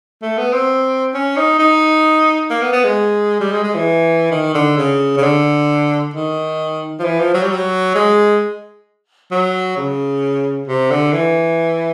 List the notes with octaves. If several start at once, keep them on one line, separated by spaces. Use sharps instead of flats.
A3
B3
C4
C#4
D#4
D#4
A#3
B3
B3
G#3
G3
G#3
G#3
E3
D#3
D3
C#3
C#3
D3
D#3
F3
E3
F3
F#3
G3
F#3
G#3
F#3
C#3
C3
D3
E3